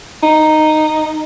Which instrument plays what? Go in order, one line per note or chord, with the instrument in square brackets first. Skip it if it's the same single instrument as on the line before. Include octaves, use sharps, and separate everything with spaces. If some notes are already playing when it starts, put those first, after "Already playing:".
[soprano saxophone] D#4